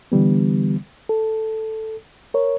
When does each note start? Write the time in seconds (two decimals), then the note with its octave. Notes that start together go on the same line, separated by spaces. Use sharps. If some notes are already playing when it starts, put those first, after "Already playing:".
0.12 D3 E3 G3 B3
1.09 A4
2.34 A#4 C#5